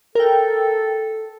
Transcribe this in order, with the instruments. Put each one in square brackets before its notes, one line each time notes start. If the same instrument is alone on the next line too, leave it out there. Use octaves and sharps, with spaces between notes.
[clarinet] A4 [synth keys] A#4 G5